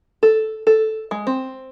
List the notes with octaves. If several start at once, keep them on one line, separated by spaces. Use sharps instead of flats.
A4
A4
G#3
C4